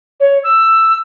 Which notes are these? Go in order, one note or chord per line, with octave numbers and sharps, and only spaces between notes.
C#5
E6